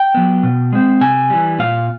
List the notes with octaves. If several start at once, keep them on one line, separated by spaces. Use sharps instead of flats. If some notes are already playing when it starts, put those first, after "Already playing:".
Already playing: G5
F#3 B3
B2
G#3 C4
C3 G#5
E3 G3
A#2 F5